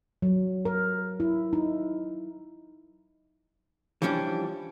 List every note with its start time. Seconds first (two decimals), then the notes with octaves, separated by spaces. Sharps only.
0.22 F#3
0.65 A#4
1.20 E4
1.53 D#4
4.02 E3 F3 G3 C#4 D4